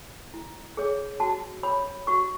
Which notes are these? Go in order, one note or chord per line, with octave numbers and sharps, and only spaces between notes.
E4
G#4 C#5
F#4 A5
C#5 B5
F#4 C#6